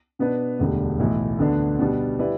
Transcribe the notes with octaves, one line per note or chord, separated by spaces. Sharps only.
B2 B3 D4 B4
E1 D2 D3 G3
B1 A2 E3
D2 D3 B3 D4
B2 G3 B3 D4
G3 E4 B4 D5